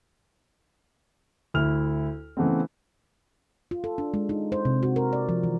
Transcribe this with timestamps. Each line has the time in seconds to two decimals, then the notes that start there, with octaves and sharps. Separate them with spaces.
1.54 D2 E4 F6 F7
2.37 C#3 E3 A3 B3 C4
3.71 F4
3.84 A4
3.98 D4
4.14 G#3
4.29 D#4
4.52 C5
4.65 C3
4.83 F#4
4.96 A#4
5.13 D5
5.29 F3
5.43 E3